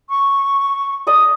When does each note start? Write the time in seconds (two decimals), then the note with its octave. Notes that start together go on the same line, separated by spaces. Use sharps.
0.09 C#6
1.07 D5 D#5 D#6